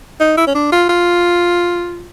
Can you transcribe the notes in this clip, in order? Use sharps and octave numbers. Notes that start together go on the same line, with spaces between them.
D#4
E4
C#4
D4
F4
F4